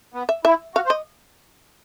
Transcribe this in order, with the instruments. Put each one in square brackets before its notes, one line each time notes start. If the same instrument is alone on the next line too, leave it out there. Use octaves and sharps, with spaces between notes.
[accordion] B3
[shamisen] E5
[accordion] E4 [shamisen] E5
[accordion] F#4 [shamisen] F5
[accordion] C5
[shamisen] D#5